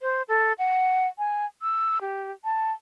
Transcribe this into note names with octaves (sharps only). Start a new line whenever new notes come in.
C5
A4
F#5
G#5
E6
G4
A5